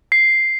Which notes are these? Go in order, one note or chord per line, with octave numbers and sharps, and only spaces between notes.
C7